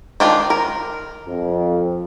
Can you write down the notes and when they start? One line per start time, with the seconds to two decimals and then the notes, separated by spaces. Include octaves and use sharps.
0.20 D#3 D4 F4
0.50 A#4
1.28 F2